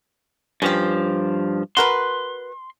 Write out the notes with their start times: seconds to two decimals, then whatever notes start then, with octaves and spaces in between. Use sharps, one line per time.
0.62 G2 F3 C#4 G4
1.77 F#4 A#4 B4 C6